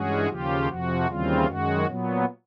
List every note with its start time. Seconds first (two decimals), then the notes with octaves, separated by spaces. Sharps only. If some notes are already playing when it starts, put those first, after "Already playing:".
Already playing: G2 E3 G#3 C#4 F#4 G#4
0.27 D#2 C#3 F3 F4 G4
0.66 F2 C3 F3 F#4
1.06 D#2 C#3 E3 G3 C4 F4
1.45 F#2 D#3 G#3 F#4
1.85 A#2 F#3 B3